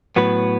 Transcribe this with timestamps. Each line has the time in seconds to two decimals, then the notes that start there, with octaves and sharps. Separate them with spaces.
0.16 A2 F#3 B3 B4